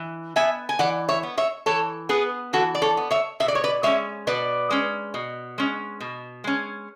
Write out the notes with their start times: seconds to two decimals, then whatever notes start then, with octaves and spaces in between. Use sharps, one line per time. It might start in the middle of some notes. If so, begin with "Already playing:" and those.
Already playing: E3
0.36 B3 E5 G#5
0.69 G#5
0.79 E3 D5 F#5
1.09 C#5 E5
1.23 B3
1.38 C#5 E5
1.66 E3 A4 C#5
2.09 B3 G#4 B4
2.53 E3 F#4 A4
2.75 D5
2.82 A4 C#5
2.97 B3
3.11 C#5 E5
3.40 B2 E5
3.48 D5
3.55 C#5
3.64 B4 D5
3.83 G#3 C#4 C#5 E5
4.27 B2 B4 D5
4.71 G#3 C#4
5.14 B2
5.58 G#3 C#4
6.00 B2
6.44 G#3 C#4